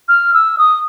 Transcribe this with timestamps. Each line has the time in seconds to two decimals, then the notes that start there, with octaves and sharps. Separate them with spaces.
0.09 F6
0.34 E6
0.58 D#6